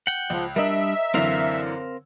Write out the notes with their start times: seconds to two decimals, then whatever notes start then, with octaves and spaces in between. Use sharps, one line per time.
0.07 F#5 G5
0.30 C#2 F3
0.56 G3 D4 A#4 D#5 E5
1.14 F#2 D3 E3 C4 A#4 F5